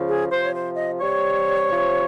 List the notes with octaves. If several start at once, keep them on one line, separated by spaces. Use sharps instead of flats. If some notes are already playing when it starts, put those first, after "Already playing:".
Already playing: C#3 F3
G#4
C3 F3 C5
C#5
C5
D#5
C3 G3 C#5
C3 F3